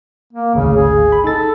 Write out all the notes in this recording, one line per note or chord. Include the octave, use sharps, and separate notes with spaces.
A#3
G#1 D2 C#3
G#4
B5
D#4 A4 A6